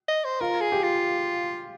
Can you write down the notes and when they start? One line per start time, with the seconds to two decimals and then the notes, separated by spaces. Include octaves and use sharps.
0.08 D#5
0.25 C5
0.41 F4 A#4
0.61 G#4
0.72 G4
0.83 F4